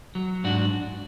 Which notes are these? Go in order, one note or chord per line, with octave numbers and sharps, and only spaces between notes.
F#3
G#2 D4 F#4